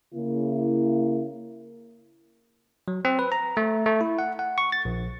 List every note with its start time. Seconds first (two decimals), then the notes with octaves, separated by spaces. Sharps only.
0.14 C#3 A#3 E4
2.88 F#3
3.05 C4
3.19 B4
3.32 A#5
3.57 A3
3.86 A3
4.01 E4
4.19 F#5
4.39 F#5
4.58 C#6
4.72 A6
4.85 A#1